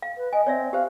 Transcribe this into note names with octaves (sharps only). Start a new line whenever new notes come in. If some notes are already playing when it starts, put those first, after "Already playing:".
F5
B4
D#5 G#5
C4 C#5 D5 E5
G4 C5 F5